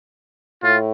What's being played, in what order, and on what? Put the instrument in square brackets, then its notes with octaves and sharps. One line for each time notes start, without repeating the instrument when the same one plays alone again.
[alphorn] A2 [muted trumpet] F4